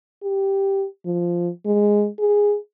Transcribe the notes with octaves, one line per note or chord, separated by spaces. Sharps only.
G4
F3
G#3
G#4